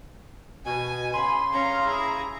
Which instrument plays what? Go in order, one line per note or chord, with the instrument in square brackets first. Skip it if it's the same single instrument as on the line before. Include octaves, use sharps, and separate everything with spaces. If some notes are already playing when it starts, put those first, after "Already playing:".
[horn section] B2 [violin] G#5
[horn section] C#3 C6 [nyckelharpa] B5
[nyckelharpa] C#4 F5 [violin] A#5
[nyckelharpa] E4 G#4